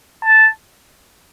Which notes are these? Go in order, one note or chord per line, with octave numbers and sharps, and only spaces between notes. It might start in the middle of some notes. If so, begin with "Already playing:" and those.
A5